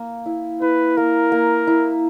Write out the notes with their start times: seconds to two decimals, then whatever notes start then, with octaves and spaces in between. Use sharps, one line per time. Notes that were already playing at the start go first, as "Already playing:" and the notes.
Already playing: A#3
0.26 E4
0.61 E4 B4
0.97 A#3 A#4
1.32 A#3
1.67 E4